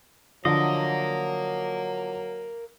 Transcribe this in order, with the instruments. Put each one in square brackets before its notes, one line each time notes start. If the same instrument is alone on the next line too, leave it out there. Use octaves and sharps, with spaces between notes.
[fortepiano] D3 F3 [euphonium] F#3 [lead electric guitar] A#4 F5 [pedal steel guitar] D#5